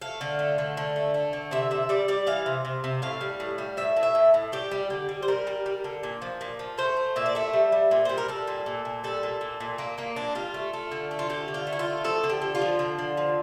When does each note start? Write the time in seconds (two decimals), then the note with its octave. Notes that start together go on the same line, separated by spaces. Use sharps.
0.02 A3 F5
0.21 D3
0.39 A3
0.58 D3
0.77 D3
0.96 A3
1.14 A3
1.33 D3
1.51 C3 E5
1.71 C3 E5
1.89 G3 D5
2.08 G3 D5
2.27 E3 F5
2.46 C3
2.65 C3
2.84 C3
3.02 A2 F5
3.21 G3
3.40 A2
3.58 G3
3.77 A2 E5
3.96 A2
4.03 E5
4.15 A2
4.34 A2
4.52 G3 G4
4.71 G3
4.90 D3
5.09 G3
5.23 C5
5.28 G3 A#4
5.47 G3
5.66 G3
5.84 D3
6.03 A#2
6.22 F3
6.41 A#2
6.59 F3
6.78 A3 C5
6.97 A3
7.16 A#2 E5
7.26 D5
7.35 A3 E5
7.53 G3
7.72 G3
7.91 A#2
8.05 G3 C5
8.18 A#4
8.28 G3 A4
8.47 A#2
8.66 A#2
8.85 A#2
9.04 G3 A4
9.23 A#2
9.41 A#2
9.60 A#2
9.78 A#2 A#3
9.98 A#2 A#3
10.16 A#2 D4
10.35 G3 F4
10.54 A3
10.73 A3
10.91 D3
11.11 A3
11.19 F4
11.29 D3 G4
11.48 D3
11.54 F4
11.67 A3
11.73 E4
11.79 F4
11.85 A3
12.04 F3 A4
12.24 D3
12.29 G4
12.41 D3
12.55 F4
12.61 F3
12.79 D3
12.99 D3
13.17 F3